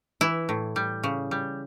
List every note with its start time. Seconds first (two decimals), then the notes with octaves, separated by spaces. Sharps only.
0.21 E3 E4
0.49 A2
0.76 G3
1.04 C#3
1.31 G3